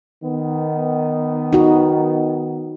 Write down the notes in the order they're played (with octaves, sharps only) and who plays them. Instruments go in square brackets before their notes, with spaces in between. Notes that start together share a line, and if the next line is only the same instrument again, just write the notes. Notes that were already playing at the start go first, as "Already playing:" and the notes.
[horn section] D#3 B3
[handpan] D#4 F#4